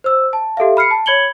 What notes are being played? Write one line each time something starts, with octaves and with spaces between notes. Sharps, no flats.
C5 E6
A5
G4 A4 E5 F5
B5 F6 C7 C#7
A5
C#5 B5 G#6 C#7 F#7 G7